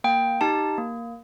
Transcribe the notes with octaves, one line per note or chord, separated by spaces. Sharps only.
A#3 G5
D#4 G4 A5
A#3